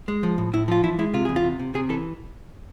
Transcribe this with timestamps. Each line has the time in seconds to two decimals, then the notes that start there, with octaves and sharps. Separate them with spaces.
0.08 G#3
0.23 F3
0.38 A2
0.53 A2 E4
0.68 F3 F4
0.83 E3 E4
0.99 G#3 E4
1.14 C3 F4
1.25 E2 G#4
1.36 F4
1.44 C3
1.59 C3
1.74 C3 G#4
1.89 E3 A4